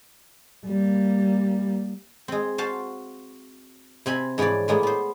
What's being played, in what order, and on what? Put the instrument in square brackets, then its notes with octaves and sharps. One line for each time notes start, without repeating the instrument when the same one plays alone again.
[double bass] G3 A#3
[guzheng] G#3 C4
F#4 C5 F5 A5
C3 C4 G#5 B5
G#2 E3 F3 C#5 D5
A2 G#3 A#3 B3
B3 C5